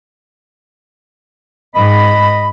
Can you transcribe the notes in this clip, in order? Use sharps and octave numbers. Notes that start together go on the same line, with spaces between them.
G#2 D#5 B5